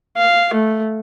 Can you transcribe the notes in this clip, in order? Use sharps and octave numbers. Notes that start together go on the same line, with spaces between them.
F5
A3